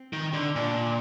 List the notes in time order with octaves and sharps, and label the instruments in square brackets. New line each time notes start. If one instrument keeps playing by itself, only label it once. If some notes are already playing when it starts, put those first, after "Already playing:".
Already playing: [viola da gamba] C4
[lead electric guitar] D#3
D3
[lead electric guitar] A#2 [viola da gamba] D4